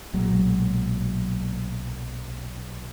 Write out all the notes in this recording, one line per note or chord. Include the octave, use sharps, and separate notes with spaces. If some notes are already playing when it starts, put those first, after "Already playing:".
B1 A#2 F#3 G#3